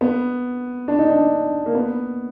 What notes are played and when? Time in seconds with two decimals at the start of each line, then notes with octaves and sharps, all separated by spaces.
0.01 B3
0.88 D4
0.99 D#4
1.10 D4
1.66 A#3
1.75 B3